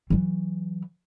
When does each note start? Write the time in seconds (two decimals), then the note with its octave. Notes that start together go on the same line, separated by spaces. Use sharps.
0.10 E3 F#3